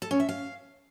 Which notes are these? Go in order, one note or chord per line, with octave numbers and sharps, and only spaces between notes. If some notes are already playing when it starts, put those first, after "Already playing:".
A4
C#4
E5
F5